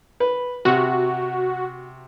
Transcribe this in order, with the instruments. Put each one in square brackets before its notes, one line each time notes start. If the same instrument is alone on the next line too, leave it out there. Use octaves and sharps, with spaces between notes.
[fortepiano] B4
[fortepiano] C3 [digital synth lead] F#4